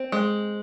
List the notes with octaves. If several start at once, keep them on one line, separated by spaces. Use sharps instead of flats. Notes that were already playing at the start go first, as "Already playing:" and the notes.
Already playing: C4
G#3